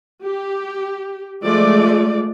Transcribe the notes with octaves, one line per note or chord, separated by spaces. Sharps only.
G4
F3 G#3 A3 D5